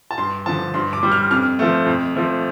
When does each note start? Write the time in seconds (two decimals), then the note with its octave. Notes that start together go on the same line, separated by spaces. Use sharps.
0.11 A5
0.18 G2 C6
0.46 D3 F3 A5
0.74 G2 C6
0.93 D6
1.03 G3
1.12 F6
1.31 F2 F6
1.59 F3 A3
1.86 F2
2.15 F3 A3